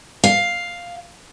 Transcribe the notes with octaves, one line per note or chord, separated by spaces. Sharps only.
F5